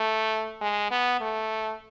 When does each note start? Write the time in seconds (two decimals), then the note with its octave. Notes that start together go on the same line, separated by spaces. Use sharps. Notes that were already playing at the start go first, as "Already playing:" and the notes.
Already playing: A3
0.62 G#3
0.91 B3
1.21 A3